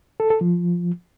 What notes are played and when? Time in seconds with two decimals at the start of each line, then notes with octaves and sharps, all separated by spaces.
0.20 A4
0.30 A4
0.41 F3